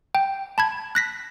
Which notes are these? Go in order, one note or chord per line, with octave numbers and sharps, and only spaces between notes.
G5
A5 B5 G#6
F#6 A#6 B6